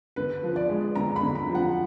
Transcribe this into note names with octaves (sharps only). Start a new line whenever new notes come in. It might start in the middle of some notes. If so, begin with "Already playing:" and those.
D3 B4
F3
D5
G#3
D3 A#5
B5
D3
A#5
F3
F#5